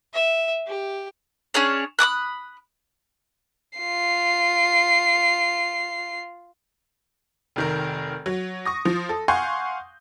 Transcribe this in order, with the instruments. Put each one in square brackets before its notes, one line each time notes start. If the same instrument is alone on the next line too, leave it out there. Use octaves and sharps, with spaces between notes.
[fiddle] E5
G4
[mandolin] C#4 D4 G#4 C#5
B5 D6 D#6 F#6
[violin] F4 C7
[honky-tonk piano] F1 D#3 A#4
F#3
C#6 D#6 A#6
F3
A4
F5 F#5 G#5 C6 C#6 G6